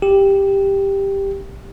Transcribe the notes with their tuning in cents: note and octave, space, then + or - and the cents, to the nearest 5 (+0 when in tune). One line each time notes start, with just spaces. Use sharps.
G4 +5